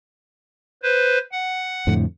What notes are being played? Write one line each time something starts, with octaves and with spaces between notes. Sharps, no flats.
B4 C5
F#5
F2 A2 D3